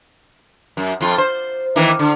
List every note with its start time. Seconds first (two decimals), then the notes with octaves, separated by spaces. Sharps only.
0.77 F#2
1.01 F2 F4
1.18 C5
1.76 D#3 E3 A#3
1.99 D3